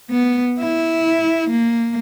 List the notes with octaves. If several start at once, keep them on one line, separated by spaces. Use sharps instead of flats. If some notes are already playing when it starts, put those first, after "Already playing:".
B3
E4
A#3